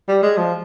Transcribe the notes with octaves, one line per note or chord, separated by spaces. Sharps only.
G3
G#3
F3